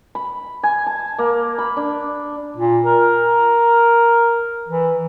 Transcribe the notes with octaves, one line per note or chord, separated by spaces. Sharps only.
B5
G#5
A5
A#3
B5
D4
A#2
A#4
E3